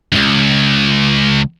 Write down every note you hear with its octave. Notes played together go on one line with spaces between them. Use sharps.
C#2 F#2